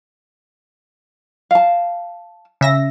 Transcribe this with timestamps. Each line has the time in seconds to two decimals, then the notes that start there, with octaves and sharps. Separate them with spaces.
1.51 F5 A5
2.61 C#3 E5 A#6